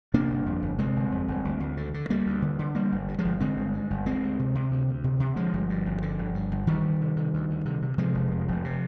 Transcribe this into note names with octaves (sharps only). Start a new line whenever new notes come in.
C3 A#3 D4
G1
F2
G1
C3 G#3 C4
G1
F2
G1
D2
D2
D3
D3
D2 G3 A#3
D2
D3
D3
D3 G3 A#3
G1
G2
F3 G#3
G1
D3 G#3 C4
G1
G2
G1
D2 G#3 C4
D2
C3
C3
D2
D2
C3
C3
D3 F3 G#3
G1
G2
G1
D3
G1
G2
G1
D2 D#3 G3
D2
C3
C3
D2
D2
C3
C3
C3 F3 G#3
F1
F2
F1
C3